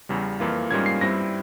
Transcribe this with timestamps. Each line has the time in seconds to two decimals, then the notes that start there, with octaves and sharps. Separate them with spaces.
0.09 E2 C#3 G3
0.40 F2 E3 A#3 F4
0.71 G#2 G3 A#3 C#4 F4 G#6
0.86 C7
1.01 G2 G3 C4 E4 A#6